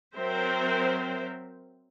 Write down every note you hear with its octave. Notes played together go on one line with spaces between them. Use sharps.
F#3 C4 A#4 C5 E5